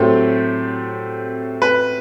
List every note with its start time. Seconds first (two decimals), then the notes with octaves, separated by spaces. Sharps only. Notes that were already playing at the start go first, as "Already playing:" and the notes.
Already playing: A2 F#3 A3 C4 G4
1.62 B4